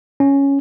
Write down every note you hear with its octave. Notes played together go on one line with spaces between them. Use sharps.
C#4